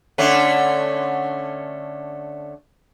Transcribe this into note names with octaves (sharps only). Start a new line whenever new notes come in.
D3 A3 C#4